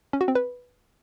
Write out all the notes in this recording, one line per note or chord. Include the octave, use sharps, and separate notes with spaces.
C#4
F#4
C4
B4